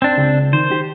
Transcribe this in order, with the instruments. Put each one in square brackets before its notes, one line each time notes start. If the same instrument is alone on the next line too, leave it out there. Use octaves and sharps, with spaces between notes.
[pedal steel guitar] C4 D4
[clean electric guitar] C#2
[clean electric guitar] D#3 [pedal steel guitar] C5
[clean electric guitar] G4